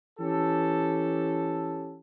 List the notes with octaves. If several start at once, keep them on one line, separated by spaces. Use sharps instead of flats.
E3 C#4 G4 A4